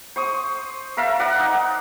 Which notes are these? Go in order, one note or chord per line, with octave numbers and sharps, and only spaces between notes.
C5 C#6 D#6
A4 A#4 E5 F5
A#4 D5 F#5
D#4